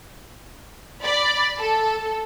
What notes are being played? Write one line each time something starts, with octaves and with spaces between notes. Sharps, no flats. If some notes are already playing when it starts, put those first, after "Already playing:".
D5 B5
A4